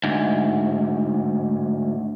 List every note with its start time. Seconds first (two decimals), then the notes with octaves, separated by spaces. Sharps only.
0.04 D2 G#2